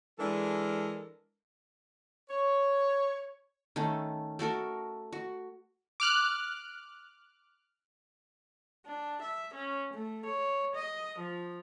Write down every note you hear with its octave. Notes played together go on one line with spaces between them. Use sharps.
E3 G#3 D4 A4 A#4
C#5
D#3 A3 C#4
A3 F#4 A4 A#4
F#4
D6 F6 F#6
D4
E5
C#4
A3
C#5
D#5
F3